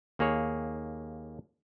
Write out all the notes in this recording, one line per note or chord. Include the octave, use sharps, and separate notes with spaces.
D#2 A#3 G#4 C#5